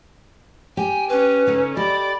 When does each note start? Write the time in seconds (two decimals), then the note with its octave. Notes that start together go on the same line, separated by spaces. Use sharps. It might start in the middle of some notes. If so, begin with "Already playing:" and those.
0.77 G4 G5 G#5
1.09 C#4 B4
1.46 C#3 D#4 A4
1.76 G4 A4 D5 D#5 B5